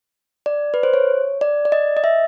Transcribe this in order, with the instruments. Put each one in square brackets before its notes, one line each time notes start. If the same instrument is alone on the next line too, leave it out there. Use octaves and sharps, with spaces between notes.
[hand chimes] D5
B4
C5
C#5
D5
D5
D#5
D#5
E5